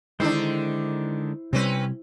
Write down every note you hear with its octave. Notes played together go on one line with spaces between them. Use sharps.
D3 D#3 G#3 D4 E4 C5
C3 G3 C4 C#4 B4